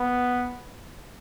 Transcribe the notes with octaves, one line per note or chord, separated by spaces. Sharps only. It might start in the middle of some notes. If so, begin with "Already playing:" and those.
Already playing: B3